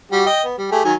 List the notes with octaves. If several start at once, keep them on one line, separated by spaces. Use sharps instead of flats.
G3 F#4 G4
D#5 G5
B3
G3
A3 G4 G#4
D#3 F#3 G#5